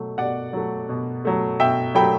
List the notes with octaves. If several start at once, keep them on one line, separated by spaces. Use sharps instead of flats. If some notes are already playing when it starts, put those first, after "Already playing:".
Already playing: B2 F#3 A3
B2 D5 F#5
F#3 A3
B2
F#3 A3
B2 E5 G5
F#3 A3 G5 B5